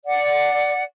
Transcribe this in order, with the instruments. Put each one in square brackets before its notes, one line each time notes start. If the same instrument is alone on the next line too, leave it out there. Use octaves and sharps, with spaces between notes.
[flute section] D5 F#5